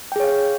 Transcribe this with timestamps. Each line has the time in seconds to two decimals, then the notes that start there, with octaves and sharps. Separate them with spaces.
0.12 G5
0.16 G#4
0.20 C#5
0.24 F5